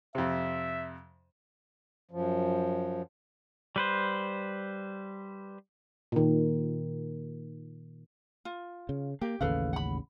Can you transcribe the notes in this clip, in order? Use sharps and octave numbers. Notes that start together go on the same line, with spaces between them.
F2 C3 E5
F#2 F3
G3 B4 C5
A#2 D#3
F4
C#3
A#3 G4
A1 D#2 C#3 A4 B4 F5
F#5 B5